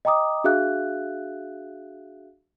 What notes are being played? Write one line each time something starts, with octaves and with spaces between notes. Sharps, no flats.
D#5 G5 A#5 D6 D#6
D4 F#4 G#4 E5 F5 F#6